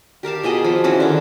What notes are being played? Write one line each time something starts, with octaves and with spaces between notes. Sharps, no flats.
G4 A#4 F5 A5
B2 F4 G#4 D#5
F3
E3 C#4 F#4
D3 D#3